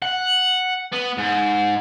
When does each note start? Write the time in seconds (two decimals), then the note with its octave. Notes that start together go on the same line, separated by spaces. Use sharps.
0.02 F#5
0.93 B3
1.18 G#2